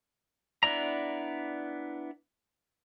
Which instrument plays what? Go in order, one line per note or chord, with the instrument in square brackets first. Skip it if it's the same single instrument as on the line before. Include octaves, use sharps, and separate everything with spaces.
[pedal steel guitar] B3 D4 E4 D5 A#5